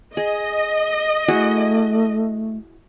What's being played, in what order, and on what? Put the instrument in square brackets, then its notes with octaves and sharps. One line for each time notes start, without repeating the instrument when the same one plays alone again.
[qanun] G#4 [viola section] D#5
[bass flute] A3 [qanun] E4 F#4 G#4